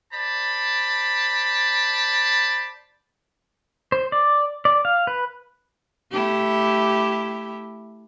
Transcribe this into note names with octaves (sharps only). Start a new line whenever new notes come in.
C5 D5 A5 B5
C5
D5
D5
F5
B4
A3 E4 G4